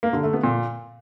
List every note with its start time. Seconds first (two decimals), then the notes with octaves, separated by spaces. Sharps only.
0.03 A#3
0.13 D3
0.23 A3
0.33 B3
0.44 A#2